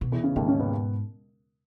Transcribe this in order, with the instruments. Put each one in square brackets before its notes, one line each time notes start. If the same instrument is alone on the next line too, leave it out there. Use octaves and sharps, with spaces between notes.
[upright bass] B2
[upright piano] E2 E3
C#3
[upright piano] D#2 D#3 [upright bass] G#2
[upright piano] C#3 C#4
B2 B3